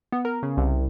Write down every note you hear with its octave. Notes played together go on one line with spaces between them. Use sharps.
B3
A#4
C#3
C2